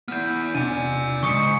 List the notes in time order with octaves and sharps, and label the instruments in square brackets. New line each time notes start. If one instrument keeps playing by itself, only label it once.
[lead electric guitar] B3 E4 [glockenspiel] F6 G6
[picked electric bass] E1 C3 D4 [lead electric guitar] D5 G#5 [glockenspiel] D#7
[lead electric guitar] F2 G#2 [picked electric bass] C#3 [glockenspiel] C#6 D#6 C#7